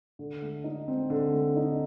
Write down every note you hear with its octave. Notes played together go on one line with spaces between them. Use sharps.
D3
A3
D#4
C4
D3
A3
D#4